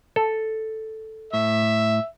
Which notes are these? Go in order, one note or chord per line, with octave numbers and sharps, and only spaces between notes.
A4
A2 E5